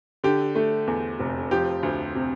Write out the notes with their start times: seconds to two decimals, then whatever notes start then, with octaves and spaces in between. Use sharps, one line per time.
0.24 D3 G4
0.55 A3
0.87 E2
1.20 F1
1.51 F3 G4
1.83 D2
2.15 C3